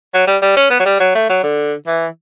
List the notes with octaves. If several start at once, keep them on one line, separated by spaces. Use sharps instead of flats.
F#3
G3
G3
C#4
B3
F#3
G3
F#3
A3
F#3
D3
E3